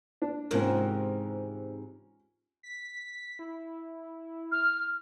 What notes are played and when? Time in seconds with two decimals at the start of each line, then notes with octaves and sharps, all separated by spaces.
0.22 D4
0.51 G#2 C3 E3 C#4 F4 A#4
2.63 B6
3.39 E4
4.52 F6